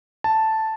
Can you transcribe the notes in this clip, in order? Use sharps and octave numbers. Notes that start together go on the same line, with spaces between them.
A5